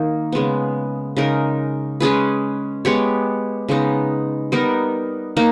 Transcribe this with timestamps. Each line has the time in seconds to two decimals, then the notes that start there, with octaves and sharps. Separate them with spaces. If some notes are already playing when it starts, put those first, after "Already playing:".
Already playing: D#3 A#3 D#4
0.32 C#3 G#3 B3
1.17 C#3 G#3 D#4 A#4
2.00 G#3 C#4 G#4 B4
2.85 G#3 B3 G4 C#5
3.69 C#3 G#3 B3 D#4
4.52 G3 B3 D#4 A#4
5.37 A#3 D#4